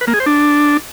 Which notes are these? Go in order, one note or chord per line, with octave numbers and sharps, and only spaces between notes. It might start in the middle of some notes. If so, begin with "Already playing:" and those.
B4
A#3
G#4
C5
D4